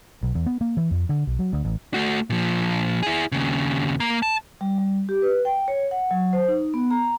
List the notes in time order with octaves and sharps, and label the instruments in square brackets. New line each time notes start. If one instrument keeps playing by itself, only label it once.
[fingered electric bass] B1
E2
B3
A#3
E3
F2
D3
B1
F#3
D2
A1
[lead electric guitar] A3 F#4
A#2 F3
E4 G#4
D#2 C#3
A#3 A#5
A5
[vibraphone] G3
G3
G4
B4
G5
C#5
F#5
F#3
C5
D#4
B3
A#5